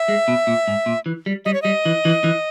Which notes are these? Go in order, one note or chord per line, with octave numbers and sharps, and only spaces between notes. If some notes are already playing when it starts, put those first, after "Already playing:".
Already playing: E5
G#3
B2
A#2
G#2
A#2
E3
G3
G3 D#5
C#5
G3 D#5
E3
E3
E3